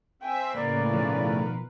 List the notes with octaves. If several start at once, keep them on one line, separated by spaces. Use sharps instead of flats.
C4 E5 G5 G#5
A2 C#3 A#3 A#4 B4 D5
B2 D#3 F3